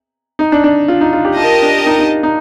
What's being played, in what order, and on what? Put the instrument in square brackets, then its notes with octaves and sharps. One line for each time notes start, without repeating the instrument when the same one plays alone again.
[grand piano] D#4
D4
D4
F4
D#4
F4
G4
[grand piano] F4 [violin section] G4 A#4 D#5 A5
[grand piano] D4
D#4
D#4
D#4